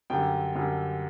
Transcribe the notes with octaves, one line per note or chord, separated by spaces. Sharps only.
F#2 D3 G3 G5
F#2 D3 G3